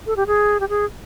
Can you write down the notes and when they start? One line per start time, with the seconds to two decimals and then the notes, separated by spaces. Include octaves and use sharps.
0.07 A4
0.16 G4
0.27 G#4
0.60 G4
0.69 G#4